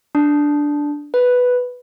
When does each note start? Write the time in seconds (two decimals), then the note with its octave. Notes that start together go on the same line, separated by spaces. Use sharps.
0.15 D4
1.14 B4